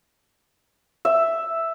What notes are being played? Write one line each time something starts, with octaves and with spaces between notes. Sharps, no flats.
E5